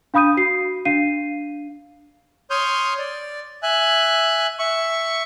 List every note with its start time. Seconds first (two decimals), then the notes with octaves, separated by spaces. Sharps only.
0.14 D4 F5 B5 D#6 G6 D#7
0.37 F#4 C7
0.85 D4 F5 C7 D#7
2.50 C#5 C6 D#6 F6 G6
2.99 D5
3.63 E5 G#5 F#6
4.59 E5 C#6